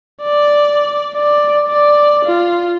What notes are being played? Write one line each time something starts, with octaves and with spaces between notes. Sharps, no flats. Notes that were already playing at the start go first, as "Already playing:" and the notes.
D5
D5
D5
F4